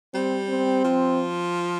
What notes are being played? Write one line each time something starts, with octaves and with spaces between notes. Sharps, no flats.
G3 C4
C4
F3